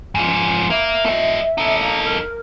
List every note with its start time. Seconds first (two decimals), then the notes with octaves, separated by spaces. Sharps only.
0.15 G#2 F3
0.70 A#3 E5
1.06 A3 D#5
1.58 D#4 A4
1.79 A#3
2.04 A#4